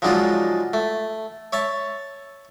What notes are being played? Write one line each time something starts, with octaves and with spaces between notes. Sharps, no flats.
F3 F#3 G#3 D4 D#4 F4
A3
C#5 E5 A5